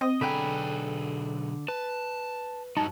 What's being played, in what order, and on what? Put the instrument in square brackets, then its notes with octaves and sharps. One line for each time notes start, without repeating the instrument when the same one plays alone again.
[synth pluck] C4 [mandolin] D#5
[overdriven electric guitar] B1 G#4 [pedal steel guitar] D3 A4 A#5 [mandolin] F#5 G5 B5
[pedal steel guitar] B4 [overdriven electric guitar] A5
[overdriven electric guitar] G2 F#3 [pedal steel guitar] D#4 [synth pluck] A5